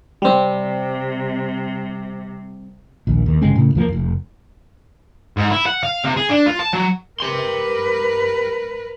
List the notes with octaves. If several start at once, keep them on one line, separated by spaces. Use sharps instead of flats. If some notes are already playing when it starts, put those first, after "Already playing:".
C3 G3 C4
A#1 D#2
D#2
G1 C#3 G#3 C4
A2 C#3
E2 F3 F#3 A#3
F1
G#2
E4
F#5
F5
C3
G#4
D4
F4
A5
F#3
G4 A#4 B4 C6